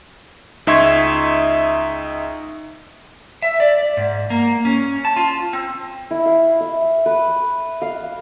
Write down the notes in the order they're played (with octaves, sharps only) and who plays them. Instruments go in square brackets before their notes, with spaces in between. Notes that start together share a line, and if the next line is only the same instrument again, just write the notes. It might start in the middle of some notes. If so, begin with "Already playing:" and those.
[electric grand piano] C#2 D#4 E5 C6 C#6 G#6
[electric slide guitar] E5
D5
G#2
A#3
C#4
A5
F4
C4
[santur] E4
F5
E5
B4
F5